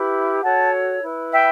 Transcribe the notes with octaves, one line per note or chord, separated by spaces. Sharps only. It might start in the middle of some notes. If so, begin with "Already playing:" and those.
Already playing: E4 G4 B4
F#4 A4 C#5 F#5 A5
E4 B4
E5 G5